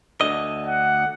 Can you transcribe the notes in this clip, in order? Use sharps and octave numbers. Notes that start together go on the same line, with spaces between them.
D2 D3 D#5
F#5